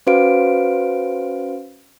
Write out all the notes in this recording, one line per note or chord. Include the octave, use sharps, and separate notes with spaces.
C#4 F#4 B4 C5 F5 D7